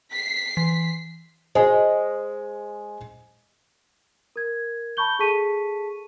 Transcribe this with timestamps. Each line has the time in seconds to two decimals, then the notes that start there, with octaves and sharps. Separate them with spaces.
0.11 B6 C7
0.57 E3
1.55 G#3 C5 G#5
4.36 A#4 G#6
4.97 A5 B5 C#6 G6 G7
5.19 G#4 A4 A5 C#6 B6 D#7